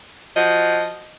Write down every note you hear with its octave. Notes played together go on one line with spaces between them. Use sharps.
F3 F#4 D#5